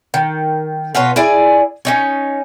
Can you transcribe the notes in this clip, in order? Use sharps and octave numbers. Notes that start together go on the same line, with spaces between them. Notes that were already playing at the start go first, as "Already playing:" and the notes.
D#3
B2 F4 B4 C#5
E4 G#4 D5 G#5
C#4 D#4 C#5